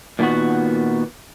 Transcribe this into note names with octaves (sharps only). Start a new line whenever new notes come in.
A#2 D#3 G3 B3 F#4